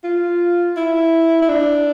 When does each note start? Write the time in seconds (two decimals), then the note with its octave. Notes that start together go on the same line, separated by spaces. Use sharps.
0.04 F4
0.77 E4
1.42 E4
1.49 D4